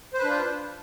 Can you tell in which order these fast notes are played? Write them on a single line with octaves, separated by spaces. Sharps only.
C5 B4 D4 F4